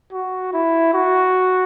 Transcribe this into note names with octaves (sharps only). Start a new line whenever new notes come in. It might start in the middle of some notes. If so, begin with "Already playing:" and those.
F#4
E4
F#4